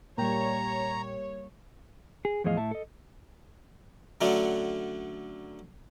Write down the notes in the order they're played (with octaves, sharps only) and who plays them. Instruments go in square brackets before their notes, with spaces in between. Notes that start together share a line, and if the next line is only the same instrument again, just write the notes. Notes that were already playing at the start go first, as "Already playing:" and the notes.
[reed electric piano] A#2 G5 [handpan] G3 A#3 [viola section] C#5 [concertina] A#5
[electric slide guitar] G#4
E2 A2 F3 G#4 D#5 F5
A2 E5 A5
A4 D#5
[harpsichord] D3 F#3 A3 C#4 D4